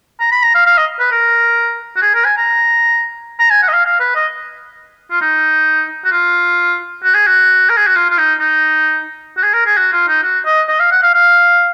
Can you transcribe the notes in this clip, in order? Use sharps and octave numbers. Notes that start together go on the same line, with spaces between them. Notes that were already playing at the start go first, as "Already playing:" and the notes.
A#5
B5
A#5
F5
F5
D#5
B4
A#4
F#4
G#4
A#4
G#5
A#5
A#5
G#5
F#5
D#5
F5
F5
B4
D#5
F4
D#4
F#4
F4
F#4
G#4
F#4
A#4
G#4
F#4
F4
F4
D#4
D#4
F#4
G#4
A#4
G#4
F#4
F4
D#4
F#4
D#5
D#5
F5
F#5
F5
F5